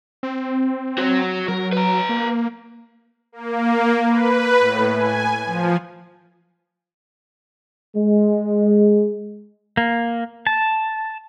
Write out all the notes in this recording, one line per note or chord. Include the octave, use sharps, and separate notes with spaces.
C4
F#4 C#5
F#3 A#4
B4 A#5
A#3
A#3
B4
A2
G#5
F3
G#3
A#3
A5